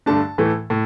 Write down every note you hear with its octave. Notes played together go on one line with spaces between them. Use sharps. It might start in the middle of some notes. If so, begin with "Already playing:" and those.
G2 D3 A3 D4 A5
A2 E3 A3
A2